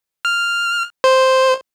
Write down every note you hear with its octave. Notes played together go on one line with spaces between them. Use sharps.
F6
C5